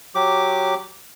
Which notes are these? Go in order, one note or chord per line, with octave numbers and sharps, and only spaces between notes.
F#3 G4 D6